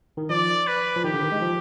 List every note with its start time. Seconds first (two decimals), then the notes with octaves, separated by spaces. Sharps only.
0.17 D#3
0.30 F3 D5
0.67 B4
0.96 F3
1.04 D#3 G4
1.14 D3
1.23 D#3
1.32 G#3
1.42 F3